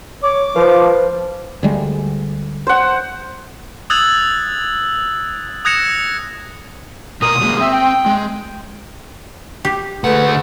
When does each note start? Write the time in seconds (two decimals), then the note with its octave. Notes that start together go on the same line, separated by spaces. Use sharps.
0.23 C#5 D6
0.56 F3 B4 C5
1.63 D2 G3 G#3
2.67 C5 F#5
3.90 D#6 E6 F#6 G#6 A6 F#7
5.65 D#6 F#6 G#6 A#6 C#7 E7
7.22 B2 A#4 A#5 D#6
7.41 F#3 G#3 A#3
7.60 C4 E5
7.73 G5
8.06 G#3
9.65 G4
10.04 D2 G#3 A3 B4 F#5